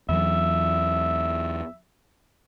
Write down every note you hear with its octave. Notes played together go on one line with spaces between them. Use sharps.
E2 E3 F#3 E5